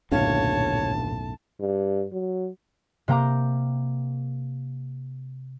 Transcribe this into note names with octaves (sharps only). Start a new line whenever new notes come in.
D#1 B1 F#2 A2 D3 C#5 F5 A5
G2
F#3
C3 A#3 G5 A#5 D6